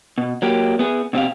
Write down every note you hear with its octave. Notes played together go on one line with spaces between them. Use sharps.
B2
F#3 A#3 G4
B3 G#4
B2 C4 G4 F5